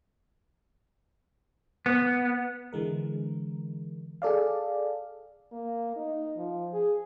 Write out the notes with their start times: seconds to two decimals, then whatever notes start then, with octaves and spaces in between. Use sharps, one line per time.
1.86 B3
2.73 D3 E3 G#3 A#4
4.22 G#4 A4 D5 F5
5.52 A#3
5.96 D#4
6.36 F3
6.73 G#4